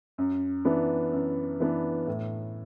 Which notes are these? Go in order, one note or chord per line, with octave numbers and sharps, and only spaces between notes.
F#2
E3 B3 D4
F#2
E3 B3 D4
A2